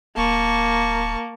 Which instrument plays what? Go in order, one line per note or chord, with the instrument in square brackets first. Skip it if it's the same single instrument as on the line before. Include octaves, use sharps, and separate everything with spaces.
[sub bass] D1 [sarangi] A#3 [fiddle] A5 C#6